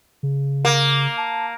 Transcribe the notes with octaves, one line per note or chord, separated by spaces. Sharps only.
C#3
A#3
A5